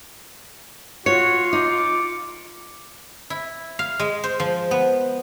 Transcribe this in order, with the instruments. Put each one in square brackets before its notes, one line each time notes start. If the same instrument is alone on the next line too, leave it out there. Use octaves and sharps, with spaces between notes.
[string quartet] F4 [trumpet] F#4 [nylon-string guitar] C#5 [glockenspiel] C#7
[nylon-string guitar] D#4 [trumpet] D6
[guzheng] E4
F5
G#3
C5
F3
B3